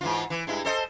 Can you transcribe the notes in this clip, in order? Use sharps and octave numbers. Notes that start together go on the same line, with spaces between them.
G#2 E3 F4
E3
G2 G#3 E4
A4 C5 D#5